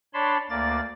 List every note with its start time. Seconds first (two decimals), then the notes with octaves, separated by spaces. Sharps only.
0.14 D4 C#5 A5 B5 C6
0.50 D2 A#3 D5 A6